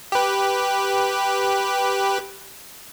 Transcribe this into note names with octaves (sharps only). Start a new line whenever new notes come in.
G4 B4